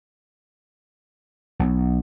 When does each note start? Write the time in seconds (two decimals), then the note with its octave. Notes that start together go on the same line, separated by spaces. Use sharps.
1.59 B1